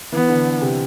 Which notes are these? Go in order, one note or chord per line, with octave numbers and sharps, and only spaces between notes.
E3 B3
D3
C3